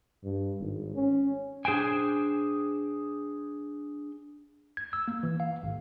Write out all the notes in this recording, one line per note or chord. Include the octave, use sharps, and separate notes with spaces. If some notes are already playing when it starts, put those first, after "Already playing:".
G2
G#1
C#4
D4 G#4 C5 G5 G#5
G#6
E6
A#3
E3
F5
G#1